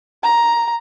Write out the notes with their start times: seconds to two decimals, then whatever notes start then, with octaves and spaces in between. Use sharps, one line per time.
0.24 A#5